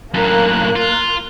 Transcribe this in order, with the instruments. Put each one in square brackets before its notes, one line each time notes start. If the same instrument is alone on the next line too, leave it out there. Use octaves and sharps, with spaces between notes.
[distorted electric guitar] F#2 A2 [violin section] A#3 F#6
[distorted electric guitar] F4